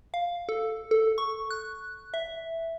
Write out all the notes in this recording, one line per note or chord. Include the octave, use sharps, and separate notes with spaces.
F5
A4
A4
C#6
F#6
E5